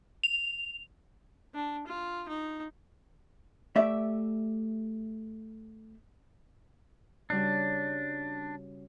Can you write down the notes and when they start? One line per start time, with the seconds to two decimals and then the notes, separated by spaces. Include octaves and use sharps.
0.24 F7
1.55 D4
1.87 F4
2.29 D#4
3.76 A3 G4 D5 E5
7.30 C#3 G3 D4 F#4